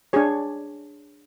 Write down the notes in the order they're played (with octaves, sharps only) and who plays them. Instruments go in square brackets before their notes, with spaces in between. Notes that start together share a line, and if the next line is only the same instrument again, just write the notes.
[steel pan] D4 G#4 C#5